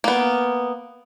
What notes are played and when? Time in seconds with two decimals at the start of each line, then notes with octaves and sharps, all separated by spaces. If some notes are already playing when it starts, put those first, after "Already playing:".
0.04 A#3 B3